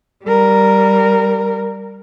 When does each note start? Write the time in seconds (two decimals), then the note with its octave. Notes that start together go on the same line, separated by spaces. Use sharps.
0.24 G3 A#4